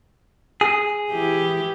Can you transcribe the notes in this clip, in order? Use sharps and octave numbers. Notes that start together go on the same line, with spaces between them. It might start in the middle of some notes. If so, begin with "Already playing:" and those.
G#4
E3 E4 G4